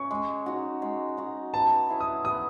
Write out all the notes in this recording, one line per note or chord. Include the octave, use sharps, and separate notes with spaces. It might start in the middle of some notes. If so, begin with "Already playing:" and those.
Already playing: C#4 C#6
G#3
D#4 F#4
G#3
D#4 F#4
B3 A5
E4 G#4 C#5
D#6
B3 D#6